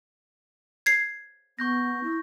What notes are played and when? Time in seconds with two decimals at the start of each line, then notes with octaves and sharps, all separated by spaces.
0.86 G#6 C7
1.59 B3 C#6 G6 A#6
2.04 E4